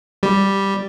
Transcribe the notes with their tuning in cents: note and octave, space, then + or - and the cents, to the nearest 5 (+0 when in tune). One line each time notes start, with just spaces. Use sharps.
G3 +0